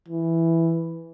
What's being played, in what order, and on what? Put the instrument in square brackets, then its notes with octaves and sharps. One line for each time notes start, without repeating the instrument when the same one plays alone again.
[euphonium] E3